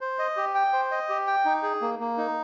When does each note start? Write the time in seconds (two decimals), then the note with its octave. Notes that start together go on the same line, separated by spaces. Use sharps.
0.01 C5
0.19 D#5
0.37 G4
0.55 G5
0.73 C5
0.91 D#5
1.09 G4
1.27 G5
1.45 D#4
1.63 G#4
1.81 A#3
1.99 A#3
2.18 D#4